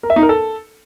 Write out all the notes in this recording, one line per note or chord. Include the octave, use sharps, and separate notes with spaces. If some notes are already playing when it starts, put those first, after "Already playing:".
A#4
E5
D#4
A#4
A4